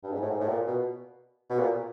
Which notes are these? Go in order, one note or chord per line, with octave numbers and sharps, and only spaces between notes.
G2
G#2
A2
G#2
A2
A#2
B2
B2
A#2